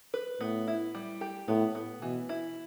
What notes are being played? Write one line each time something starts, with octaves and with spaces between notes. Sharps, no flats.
B4
A2 B3
E4
G3
G4
A2 B3
B3
B2 E3
E4